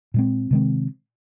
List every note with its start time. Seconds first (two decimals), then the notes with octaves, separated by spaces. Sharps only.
0.14 A#2 G#3 C4
0.51 C3 D#3 G#3 C4